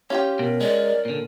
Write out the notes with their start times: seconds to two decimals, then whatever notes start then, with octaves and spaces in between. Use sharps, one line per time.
0.10 C#4 F4 G4 G5
0.39 B2 A#4
0.61 G#3 D5
1.05 A#2 D3